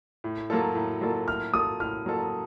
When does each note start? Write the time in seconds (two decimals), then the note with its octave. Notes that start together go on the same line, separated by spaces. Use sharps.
0.24 A2
0.50 F#3 A#3 F4 A4
0.75 A2
1.01 F#3 A#3 F4 A4
1.27 A2 F6
1.53 F#3 A#3 F4 A4 D#6
1.80 A2 F6
2.06 F#3 A#3 F4 A4